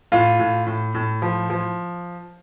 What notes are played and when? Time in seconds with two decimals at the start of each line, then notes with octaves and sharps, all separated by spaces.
0.12 A2 F4
0.39 A2
0.67 A2
0.95 A2
1.22 F3
1.50 F3